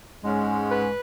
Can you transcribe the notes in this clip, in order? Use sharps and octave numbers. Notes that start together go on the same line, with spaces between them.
G#2 G#3 C#4
B4